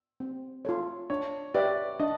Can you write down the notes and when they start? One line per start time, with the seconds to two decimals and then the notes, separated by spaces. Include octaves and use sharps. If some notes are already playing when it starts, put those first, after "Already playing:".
0.20 C4
0.65 F4 A4 C#5
1.10 D4 C#5
1.54 G4 B4 D5 E5 G5
2.00 D4 D#5